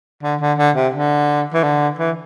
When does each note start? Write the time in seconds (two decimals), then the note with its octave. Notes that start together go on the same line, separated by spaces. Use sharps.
0.23 D3
0.41 D3
0.58 D3
0.76 C3
0.94 D3
1.54 E3
1.63 D3
1.99 E3